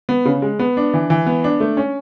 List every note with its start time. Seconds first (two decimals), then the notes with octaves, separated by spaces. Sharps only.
0.09 B3
0.25 C#3
0.42 G#3
0.59 B3
0.77 D4
0.94 E3
1.10 E3
1.26 B3
1.44 D4
1.60 A3
1.77 C#4